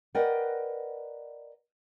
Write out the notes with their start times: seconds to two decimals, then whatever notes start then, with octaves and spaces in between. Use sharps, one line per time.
0.15 A#4 B4 D5 D#5 F#5 G5